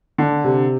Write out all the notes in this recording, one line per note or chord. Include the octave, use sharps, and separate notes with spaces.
D3 D4
C3